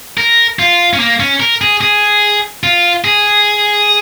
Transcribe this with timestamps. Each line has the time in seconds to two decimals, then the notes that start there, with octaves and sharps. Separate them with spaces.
0.18 A#4
0.59 F4
0.93 C#4
1.00 A#3
1.20 C#4
1.40 A#4
1.61 G#4
1.81 G#4
2.64 F4
3.04 G#4